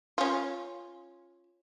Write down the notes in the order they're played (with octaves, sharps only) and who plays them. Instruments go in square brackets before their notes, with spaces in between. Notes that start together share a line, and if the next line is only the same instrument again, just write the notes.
[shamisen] C#4 F4